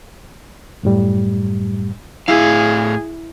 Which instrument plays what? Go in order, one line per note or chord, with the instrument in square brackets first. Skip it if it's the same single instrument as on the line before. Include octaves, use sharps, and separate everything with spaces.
[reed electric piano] F#2 A2 G3
[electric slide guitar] A2 F5 [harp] E4 C7 [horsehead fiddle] G#4